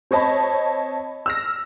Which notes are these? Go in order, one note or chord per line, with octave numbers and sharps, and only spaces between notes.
C4 C#5 D#5 A5 B5
E6 F6 A#6